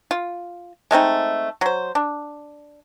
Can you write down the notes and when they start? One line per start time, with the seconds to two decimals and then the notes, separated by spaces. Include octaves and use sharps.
0.11 F4
0.91 G#3 A3 C4 D#4
1.61 F#3 C5
1.95 D4